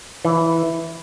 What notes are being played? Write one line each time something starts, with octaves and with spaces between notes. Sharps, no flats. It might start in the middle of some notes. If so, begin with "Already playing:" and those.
E3